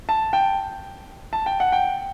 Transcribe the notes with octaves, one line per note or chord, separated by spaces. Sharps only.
A5
G5
A5
G5
F#5
G5